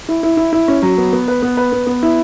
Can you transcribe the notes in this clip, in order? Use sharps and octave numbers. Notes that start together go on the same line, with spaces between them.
E4
E4
E4
E4
C#4
F#3
B3
B3
B4
B3
B4
B3
B3
E4